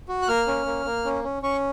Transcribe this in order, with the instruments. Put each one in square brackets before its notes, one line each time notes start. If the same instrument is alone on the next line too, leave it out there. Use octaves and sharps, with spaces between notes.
[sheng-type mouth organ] F#4
F#6
A#3 F6
C#4
A#3
A#3
C#4
C#4
C#4 C#6